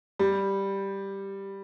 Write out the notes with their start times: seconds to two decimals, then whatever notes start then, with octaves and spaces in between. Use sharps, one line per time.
0.19 G3